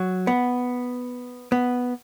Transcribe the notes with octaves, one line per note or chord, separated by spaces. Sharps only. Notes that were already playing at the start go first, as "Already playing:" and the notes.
Already playing: F#3
B3
B3